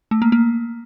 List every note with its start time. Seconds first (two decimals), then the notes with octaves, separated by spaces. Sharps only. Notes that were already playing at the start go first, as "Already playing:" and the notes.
0.11 A3
0.22 A#3
0.32 A#3